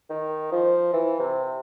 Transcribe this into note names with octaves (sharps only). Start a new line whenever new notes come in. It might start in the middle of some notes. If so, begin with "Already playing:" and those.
D#3
F3
E3
C3